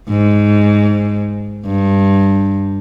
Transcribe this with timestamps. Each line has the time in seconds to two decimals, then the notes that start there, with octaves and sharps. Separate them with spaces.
0.09 G#2
1.66 G2